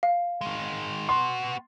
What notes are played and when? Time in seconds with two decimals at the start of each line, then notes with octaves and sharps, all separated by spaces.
0.03 F5
0.41 D#3 G#3
1.09 B3 F#4 C6